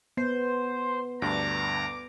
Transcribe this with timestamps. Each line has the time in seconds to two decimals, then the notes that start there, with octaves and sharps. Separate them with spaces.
0.17 B3 C5
1.22 D2 G2 D4 A#5 D6